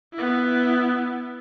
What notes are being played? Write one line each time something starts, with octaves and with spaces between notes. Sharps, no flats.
B3 E4